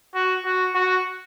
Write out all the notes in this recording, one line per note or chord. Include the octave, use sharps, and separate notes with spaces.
F#4
F#4
F#4